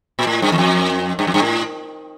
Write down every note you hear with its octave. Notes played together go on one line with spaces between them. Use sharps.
A#2
A2
G2
E2
F2
G2
F2
G2
A2